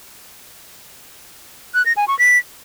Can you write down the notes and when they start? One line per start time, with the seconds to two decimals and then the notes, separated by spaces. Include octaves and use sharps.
1.75 F#6
1.86 A#6
1.97 G#5
2.08 C#6
2.19 B6